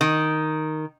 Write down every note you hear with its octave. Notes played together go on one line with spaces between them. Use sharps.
D#3